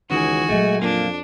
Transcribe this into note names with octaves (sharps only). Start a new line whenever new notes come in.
C#2 D#3 E3 C#4 F#4 G#5
A#2 F#3 G#3 A3
F2 A#3 D4 F4